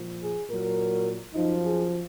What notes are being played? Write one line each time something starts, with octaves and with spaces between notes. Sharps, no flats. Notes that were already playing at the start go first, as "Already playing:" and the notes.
Already playing: A#2 F3
G#4
A#2 F#3 A#4
F#2 F3 D#4
G#4